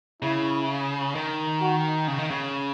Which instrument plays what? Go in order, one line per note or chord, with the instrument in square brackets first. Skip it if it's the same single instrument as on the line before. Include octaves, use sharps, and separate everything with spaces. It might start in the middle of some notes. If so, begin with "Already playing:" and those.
[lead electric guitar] C#3 [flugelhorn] E4
[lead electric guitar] D#3
[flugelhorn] F#4
[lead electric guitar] C#3
D#3
C#3